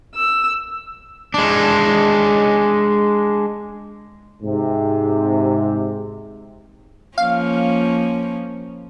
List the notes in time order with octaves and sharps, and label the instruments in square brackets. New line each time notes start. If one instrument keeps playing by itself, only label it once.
[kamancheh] E6
[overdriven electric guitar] G#3 D4
[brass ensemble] G#2 C3
[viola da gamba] F3 A#3 C#4 [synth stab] F5